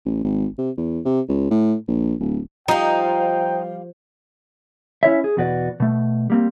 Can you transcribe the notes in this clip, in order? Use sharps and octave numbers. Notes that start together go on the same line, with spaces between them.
A1
G#1
C3
E2
C3
C#2
A2
A#1
D1
F3 G3 D#4 F5 G5
C#4 E4 C#5 E5
G#4
E2 B2 F#4 B4 D5
B2 A3
G3 A#3 C4